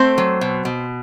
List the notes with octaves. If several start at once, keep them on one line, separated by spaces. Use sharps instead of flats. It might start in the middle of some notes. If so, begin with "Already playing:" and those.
Already playing: A3 C4 C5
F#3
B2
B2